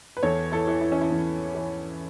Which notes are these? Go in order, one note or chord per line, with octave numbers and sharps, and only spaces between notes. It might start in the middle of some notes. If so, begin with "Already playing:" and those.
B4
E2 A4 C#5
E4 A4
E3
E4
C#4
E4
E2
E3